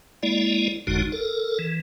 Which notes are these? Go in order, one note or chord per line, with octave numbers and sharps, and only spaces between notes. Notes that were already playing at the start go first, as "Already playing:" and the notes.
G#3 A#3 E4 D5
F#1 F2 D3 G#3 D#4 F#4
A4 A#4
E3